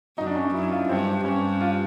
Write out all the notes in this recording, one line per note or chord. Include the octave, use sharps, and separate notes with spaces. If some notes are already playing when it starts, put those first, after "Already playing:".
F#2 D#4
D4
C#4
D#4
F#2 E4
F4
G2 C4
G2 C#4
F4